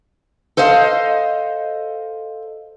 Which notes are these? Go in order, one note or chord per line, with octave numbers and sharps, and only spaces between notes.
A4 C5 D#5 F5